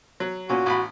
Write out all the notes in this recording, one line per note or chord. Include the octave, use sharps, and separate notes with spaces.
F#3
A#2 C#4 F#4
A1 B5